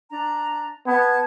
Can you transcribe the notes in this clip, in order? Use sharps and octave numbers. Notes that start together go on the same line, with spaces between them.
D4 A#5
B3 A5 G#6